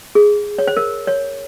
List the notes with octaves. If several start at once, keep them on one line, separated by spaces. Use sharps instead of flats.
G#4
C#5
C5
A#4
C#5